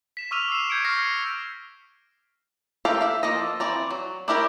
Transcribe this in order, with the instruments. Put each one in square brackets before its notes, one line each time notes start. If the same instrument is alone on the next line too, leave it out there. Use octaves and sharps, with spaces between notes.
[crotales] B6 E7
C#6 D6 E6 F6 D#7 F7
C7 E7
C#6 G6 G#6 C#7 D7
F6 A#6 C7
[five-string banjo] A3 G4 A4 A#4 F5
E5 F5
F3 A#3 A4 D#5
E3 C4 D5 A#5
F#3
D4 E4 G4 A#4 C#5